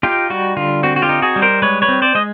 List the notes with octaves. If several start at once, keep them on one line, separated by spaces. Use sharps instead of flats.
D#4 F4 G4
G3 F#4
D3 F4
C4 F#4
F#4
F4 G4
D#4
F#4 G#4
G3
A#4 C5
G#3 B4 C#5
B4 C#5
C4
C5 D5
G#3 D#5